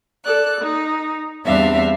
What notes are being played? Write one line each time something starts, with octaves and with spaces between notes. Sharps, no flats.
A4 D5 F#6
D#4
E2 G3 C4 D4 E5 F5